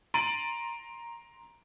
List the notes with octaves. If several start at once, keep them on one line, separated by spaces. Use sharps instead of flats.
A#5 C6 A6 D7 D#7 F#7